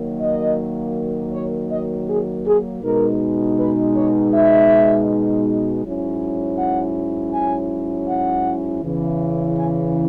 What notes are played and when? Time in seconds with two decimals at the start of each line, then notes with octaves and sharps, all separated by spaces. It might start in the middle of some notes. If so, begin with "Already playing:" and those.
Already playing: D#3 F#3 A#3
0.21 D#5
1.33 C#5
1.71 D#5
2.09 G#4
2.45 G#4
2.83 B2 G#3 D#4 A#4
3.58 B4
3.95 C#5
4.33 E5
5.82 G#2 F#3 C#4 E4
6.57 F#5
7.32 G#5
8.07 F#5
8.82 E2 C#3 E3
9.57 G#5